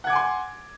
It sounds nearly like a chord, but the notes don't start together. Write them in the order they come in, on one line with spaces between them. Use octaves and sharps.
F#5 G#6 D6 G#5 C6